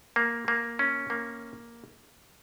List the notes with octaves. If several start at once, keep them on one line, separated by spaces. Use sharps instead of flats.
A#3
A#3
C#4
A#3